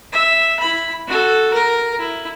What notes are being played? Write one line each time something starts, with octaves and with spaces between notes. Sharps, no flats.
E5
E4 B5
F#4 A4
A#4
E4